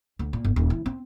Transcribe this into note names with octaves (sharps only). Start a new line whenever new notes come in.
D2
A#2
G1
D#1
E3
C4